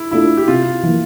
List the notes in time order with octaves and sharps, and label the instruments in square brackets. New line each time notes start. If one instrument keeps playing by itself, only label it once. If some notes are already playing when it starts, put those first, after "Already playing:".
Already playing: [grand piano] E4
[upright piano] A3 D4 F4 [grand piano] E4
[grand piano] G4
[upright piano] C3 [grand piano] F4
[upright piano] E3 A#3